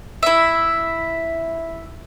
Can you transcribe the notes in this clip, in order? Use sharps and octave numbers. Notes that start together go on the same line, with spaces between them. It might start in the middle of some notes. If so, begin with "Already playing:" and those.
E4 E5